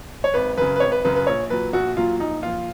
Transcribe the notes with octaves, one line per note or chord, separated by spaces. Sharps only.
C#5
G#1 B4
F#2 C#3 B4
B4
G#1 C#5
B4
F#2 C#3 B4
B4
A#1 C#5
A#2 F#3 B4
A#1 F#4
A#2 F#3 F4
A#1 D#4
A#2 F3 F4